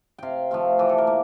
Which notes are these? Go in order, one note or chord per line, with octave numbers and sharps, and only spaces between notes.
C3 F5 G5
F3 A3 C4 F5
E3 G4
A4
A#4
A#3